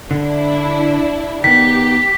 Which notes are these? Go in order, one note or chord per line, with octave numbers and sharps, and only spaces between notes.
D3 D4 E4
D#3 B3 G4 B6